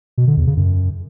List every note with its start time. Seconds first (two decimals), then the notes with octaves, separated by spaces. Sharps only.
0.18 B2
0.27 D3
0.37 E2
0.47 C#3
0.57 F#2